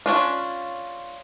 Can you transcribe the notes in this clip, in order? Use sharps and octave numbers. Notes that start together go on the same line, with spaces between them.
C#4 D4 F4